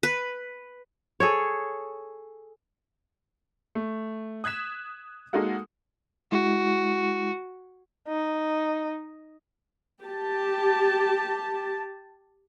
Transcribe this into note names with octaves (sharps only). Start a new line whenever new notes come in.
B4
G#4 A4 C#5
A3
D#6 F#6 G#6 B6 E7
G#3 A#3 D#4 F#4 A4 F#5
G#3 E4 F#4
D#4
G4 A5